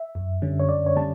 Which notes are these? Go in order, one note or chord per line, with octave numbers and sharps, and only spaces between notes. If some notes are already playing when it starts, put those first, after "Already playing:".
Already playing: E5
F#2
D3 G3 C#4
C#5
F#2 D5
C#5
D3 G3 C#4 A5